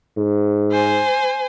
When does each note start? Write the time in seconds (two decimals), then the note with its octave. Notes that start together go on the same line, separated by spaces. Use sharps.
0.18 G#2
0.72 C5 G#5